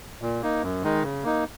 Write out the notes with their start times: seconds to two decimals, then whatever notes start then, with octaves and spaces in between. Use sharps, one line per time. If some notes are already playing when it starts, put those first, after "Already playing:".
0.22 A#2
0.43 A#3 D#4
0.63 F#2
0.83 D#3 G#3 D#4
1.03 C#3
1.24 A#3 D#4